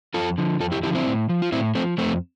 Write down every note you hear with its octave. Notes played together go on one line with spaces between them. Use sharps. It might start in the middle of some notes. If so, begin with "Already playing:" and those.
F2 F4 A4
D3 F3
F2 F4 A4
E4 G4
D3 F3 E4 G4
C4 E4
A2
F3
F4
A2 C4 E4
F3 A3 C4
F2 A3 C4